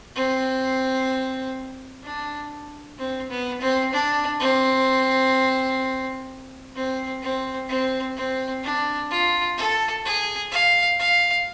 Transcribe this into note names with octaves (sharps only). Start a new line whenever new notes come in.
C4
D4
C4
B3
C4
D4
C4
C4
C4
C4
C4
D4
F4
A4
G#4
F5
F5